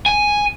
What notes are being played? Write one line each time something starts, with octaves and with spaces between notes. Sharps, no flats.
G#5